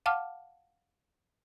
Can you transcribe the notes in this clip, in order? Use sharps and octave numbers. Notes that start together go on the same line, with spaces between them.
F5 F#5 A5 D6 F6